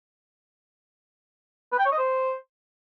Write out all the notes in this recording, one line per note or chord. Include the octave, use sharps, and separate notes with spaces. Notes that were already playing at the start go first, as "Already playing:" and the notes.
B4
G5
C#5
D#5
C5